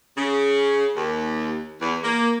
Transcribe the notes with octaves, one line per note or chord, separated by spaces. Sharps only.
C#3
D#2
E2
A#3